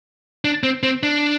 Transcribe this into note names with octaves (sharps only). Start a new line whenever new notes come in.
D4
C4
C4
D4